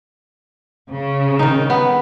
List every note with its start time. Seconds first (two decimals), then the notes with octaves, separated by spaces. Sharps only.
0.90 C#3
1.39 D#3 D#4
1.70 B3